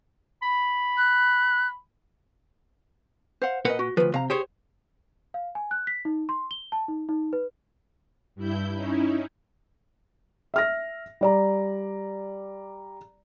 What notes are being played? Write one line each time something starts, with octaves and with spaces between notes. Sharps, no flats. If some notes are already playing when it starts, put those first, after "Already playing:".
B5
F#6
C5 F5 F#5
A#2 A#4 B4 D#5 F#5
F#4
D2 F3 B4
C3 F5 A#5
G4 G#4 C5 C#5
F5
G#5
F#6
B6
D#4
C6
G7
A5
D#4
D#4
B4
G2 E4 G6
C#4 D#4 E4
E5 F6 A#6
G3 D5 A#5